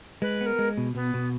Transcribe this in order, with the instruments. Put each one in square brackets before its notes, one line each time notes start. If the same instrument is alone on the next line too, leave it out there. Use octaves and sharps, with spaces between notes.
[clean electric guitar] G#3 [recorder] B4
[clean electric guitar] B3 [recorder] A#4
[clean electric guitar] G#3
B2
[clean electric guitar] B2 [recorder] B3
[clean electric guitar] B2